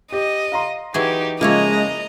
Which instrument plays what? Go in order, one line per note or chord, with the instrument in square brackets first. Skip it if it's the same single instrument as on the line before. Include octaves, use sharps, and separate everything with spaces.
[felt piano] G4 [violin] D#5
[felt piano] F5 A#5 C6
[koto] E3 F#3 G#4 [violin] D#4 G4
[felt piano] C#3 F3 [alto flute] G#3 [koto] A#3 E4 C#5 [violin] D#5 A#5